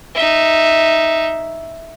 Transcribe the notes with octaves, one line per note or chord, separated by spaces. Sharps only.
D#4 E5